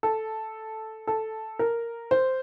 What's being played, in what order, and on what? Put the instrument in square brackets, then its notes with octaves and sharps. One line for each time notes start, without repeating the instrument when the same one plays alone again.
[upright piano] A4
A4
A#4
C5